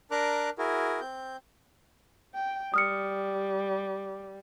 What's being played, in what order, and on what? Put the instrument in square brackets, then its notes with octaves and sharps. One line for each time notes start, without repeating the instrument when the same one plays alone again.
[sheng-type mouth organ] D4 A#4 A#5 D6 F#6
E4 F#4 G#4 A#4
C4 G6
[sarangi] G5
[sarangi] G3 [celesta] D#6 F6 C#7